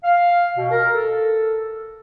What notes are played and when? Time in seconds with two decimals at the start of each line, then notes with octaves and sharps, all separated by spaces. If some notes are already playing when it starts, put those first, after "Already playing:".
0.03 F5
0.57 B2
0.71 A#4
0.94 A4